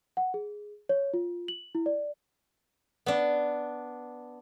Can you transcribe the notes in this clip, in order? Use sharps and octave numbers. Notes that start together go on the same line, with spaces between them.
F#5
G#4
C#5
F4
F#7
E4
D5
B3 D4